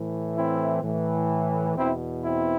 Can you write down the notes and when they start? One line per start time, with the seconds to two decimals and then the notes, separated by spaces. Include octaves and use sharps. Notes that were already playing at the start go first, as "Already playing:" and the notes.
Already playing: A2 E3
0.35 C4 E4
0.82 A2 E3
1.76 E2 B2 C4 E4
2.24 C4 E4